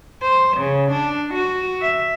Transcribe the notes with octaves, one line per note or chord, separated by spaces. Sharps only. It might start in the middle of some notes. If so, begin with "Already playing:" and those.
C5
C#3
D4
F#4
E5